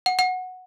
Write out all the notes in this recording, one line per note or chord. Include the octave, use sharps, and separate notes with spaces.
F#5
F#5